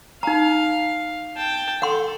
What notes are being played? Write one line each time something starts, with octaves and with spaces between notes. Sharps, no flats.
D#4 F5 A#5
G5 A5
A4 F#5 C6